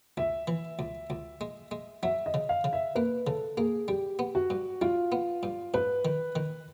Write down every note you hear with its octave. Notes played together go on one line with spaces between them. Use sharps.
C#2 E5
E3
C#2
C#2
G#3
G#3
F#3 E5
D#5
C#3
F5
C#3
E5
A#3 B4
C#3 A4
A#3 G#4
G3 G4
B3
F#4
G2
G3 F4
B3
G2
G#2 B4
D#3
D#3